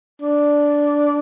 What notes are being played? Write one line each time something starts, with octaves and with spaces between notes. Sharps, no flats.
D4